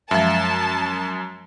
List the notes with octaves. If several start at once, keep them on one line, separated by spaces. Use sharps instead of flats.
F#2 F3 G#3 E5 A5